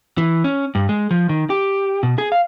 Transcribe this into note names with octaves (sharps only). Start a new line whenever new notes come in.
E3
C#4
G2
G#3
F3
D#3
G4
B2
G#4
F5